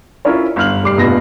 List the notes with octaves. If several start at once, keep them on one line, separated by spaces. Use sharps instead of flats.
C#4 E4 F4 A#4 C#5
G1 F#2 F6 F#7
F1 G3 D6 C7
F1 A#1 B2 F4 B4 A#6